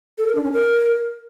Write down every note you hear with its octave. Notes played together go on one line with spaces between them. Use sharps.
A4
A#4
D4
C#4
A#4